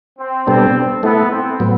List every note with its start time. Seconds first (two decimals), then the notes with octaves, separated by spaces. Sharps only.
0.19 C4
0.47 B2 G3 B3 C4 D4 A4
1.03 A3 B3 E4 A4
1.31 C4
1.60 A2 F#3 B3